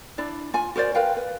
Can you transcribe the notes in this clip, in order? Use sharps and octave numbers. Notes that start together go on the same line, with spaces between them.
D4 E4 D5
F4 G#5
F#4 A#4 C5 D5
A#4 B4 F5 G5
B4